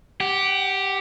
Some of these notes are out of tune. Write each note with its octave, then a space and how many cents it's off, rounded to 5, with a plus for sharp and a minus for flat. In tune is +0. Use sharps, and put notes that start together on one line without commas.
G4 +0 F#5 +30